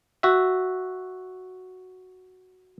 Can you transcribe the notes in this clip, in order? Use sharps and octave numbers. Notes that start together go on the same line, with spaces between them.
F#4 E5